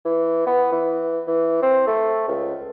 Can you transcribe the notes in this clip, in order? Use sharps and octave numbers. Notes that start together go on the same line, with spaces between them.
E3
B3
E3
E3
C4
A3
C#2